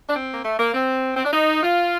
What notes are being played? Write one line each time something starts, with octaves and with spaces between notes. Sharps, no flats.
D4
C4
A#3
A3
A#3
C4
C4
D4
D#4
F4